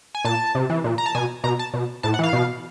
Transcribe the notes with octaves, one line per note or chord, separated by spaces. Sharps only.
G#5
A#2 A5
C3
E3
A#2
A#5
A5
B2 G#5
B2 A#5
A5
B2
A2 A5
F#5
E3 F5
B2